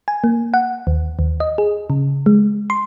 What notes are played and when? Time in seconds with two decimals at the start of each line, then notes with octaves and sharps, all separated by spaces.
0.08 G#5
0.24 A#3
0.54 F#5
0.87 D#2
1.19 D#2
1.40 D#5
1.58 G#4
1.90 C#3
2.26 G#3
2.70 C6